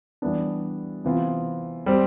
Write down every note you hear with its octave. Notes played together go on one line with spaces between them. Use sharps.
E3 G3 B3 D4
C3 E3 B3 F4
G3 C4 G4